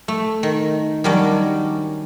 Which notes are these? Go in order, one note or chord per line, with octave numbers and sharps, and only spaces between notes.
A3
D#3
D#3 F#3 G3 C#4 D4